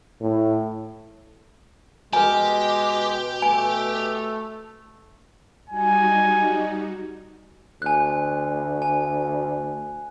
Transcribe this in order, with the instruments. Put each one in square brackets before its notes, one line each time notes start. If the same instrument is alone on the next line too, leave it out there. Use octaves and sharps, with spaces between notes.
[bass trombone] A2
[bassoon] B2 [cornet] G#3 [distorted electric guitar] G4 [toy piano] B4 G#5
[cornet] A3 [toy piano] G#5
[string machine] G3 D#4 F#4 [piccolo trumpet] G#5
[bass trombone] D2 [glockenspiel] G#5 F#6
[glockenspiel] G#5